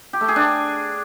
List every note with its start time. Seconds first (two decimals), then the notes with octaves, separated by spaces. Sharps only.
0.13 G4
0.21 A3
0.28 G#4
0.36 D4